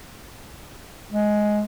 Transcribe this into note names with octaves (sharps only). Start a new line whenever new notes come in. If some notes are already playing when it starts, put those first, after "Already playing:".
G#3